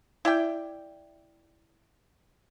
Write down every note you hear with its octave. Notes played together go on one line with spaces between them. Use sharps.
E4 D5 G5